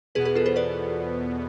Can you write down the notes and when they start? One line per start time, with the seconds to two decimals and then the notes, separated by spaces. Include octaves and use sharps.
0.15 E2 B2 B3 G#4 B4
0.25 G#4 B4
0.35 F4 A4
0.46 A4 C5
0.56 B4 D5